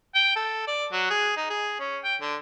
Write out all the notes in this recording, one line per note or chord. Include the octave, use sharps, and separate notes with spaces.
G5
A4
D5
F#3
G#4
D#4
G#4
C#4
G5
D3